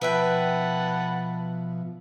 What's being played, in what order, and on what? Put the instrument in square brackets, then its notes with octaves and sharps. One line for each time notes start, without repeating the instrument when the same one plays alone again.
[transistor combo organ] B2 F3 [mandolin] B4 E5 G5 [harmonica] F#5 A5 B5